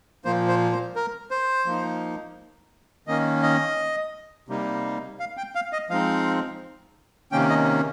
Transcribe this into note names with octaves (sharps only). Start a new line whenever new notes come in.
A#2 F3 A#3 C5
C5
C5
A#4
C5
F3 A#3 D#4
D#3 A#3 C#4 D#5
D#5
C3 G3 A#3 D#4
F5
G5
F5
D#5
F3 G#3 C4 D#4 F5
C3 D#3 A#3 C#4 G5
D#5